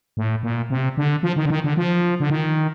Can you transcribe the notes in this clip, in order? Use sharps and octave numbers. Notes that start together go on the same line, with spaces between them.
A2
A#2
C3
D3
F3
D#3
D3
D#3
D3
F3
D3
D#3